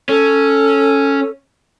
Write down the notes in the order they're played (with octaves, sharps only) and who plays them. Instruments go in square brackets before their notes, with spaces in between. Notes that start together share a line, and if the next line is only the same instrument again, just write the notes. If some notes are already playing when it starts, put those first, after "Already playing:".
[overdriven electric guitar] C#4 [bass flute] A4